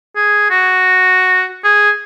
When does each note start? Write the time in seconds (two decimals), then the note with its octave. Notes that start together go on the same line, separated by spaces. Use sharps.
0.16 G#4
0.50 F#4
1.64 G#4